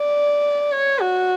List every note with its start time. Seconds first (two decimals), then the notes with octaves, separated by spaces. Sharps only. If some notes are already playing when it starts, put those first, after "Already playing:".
Already playing: D5
0.71 C#5
1.01 F#4